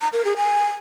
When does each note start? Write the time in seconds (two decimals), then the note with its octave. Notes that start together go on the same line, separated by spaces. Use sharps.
0.01 A#5
0.13 A#4
0.25 G#4
0.36 G#5